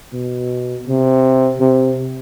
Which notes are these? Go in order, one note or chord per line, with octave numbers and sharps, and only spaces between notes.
B2
C3
C3